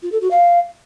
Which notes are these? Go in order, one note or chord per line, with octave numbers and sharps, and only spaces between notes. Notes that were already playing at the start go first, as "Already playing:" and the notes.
F4
A4
F#4
F5